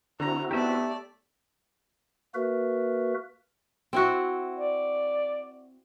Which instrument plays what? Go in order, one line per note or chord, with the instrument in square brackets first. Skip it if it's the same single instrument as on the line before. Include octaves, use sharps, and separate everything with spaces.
[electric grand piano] D3 A#6 [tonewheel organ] C4 E4 F#4 [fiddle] A#5
[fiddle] A3 D5 [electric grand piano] B3 D#4 [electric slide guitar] G4 E5
[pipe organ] A#3 F#4 A#4 B4 E5
[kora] C4 E4 F#4
[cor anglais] D5